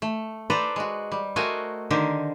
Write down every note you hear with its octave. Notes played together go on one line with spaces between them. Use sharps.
A3
A4 B4 C5 D5 G5 A#5
G#3 F#4
G3
A3 F#4 A#4 C5 D#5 G#5
D3 D#3 G4 A#4 C5